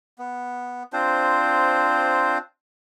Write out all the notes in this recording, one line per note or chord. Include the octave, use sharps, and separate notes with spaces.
B3
C4 D4 F4 C5